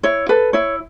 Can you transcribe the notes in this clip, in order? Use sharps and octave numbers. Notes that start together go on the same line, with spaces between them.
E4 C#5
A4 B4
E4 C#5